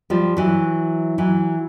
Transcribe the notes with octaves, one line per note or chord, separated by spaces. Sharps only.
F3 G3
E3 F#3
E3 F#3